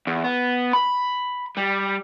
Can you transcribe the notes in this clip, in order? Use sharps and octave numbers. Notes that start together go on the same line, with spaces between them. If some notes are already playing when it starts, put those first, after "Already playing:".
E2
B3
B5
G3